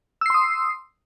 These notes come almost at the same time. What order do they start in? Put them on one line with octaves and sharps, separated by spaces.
E6 C7 C6 D#6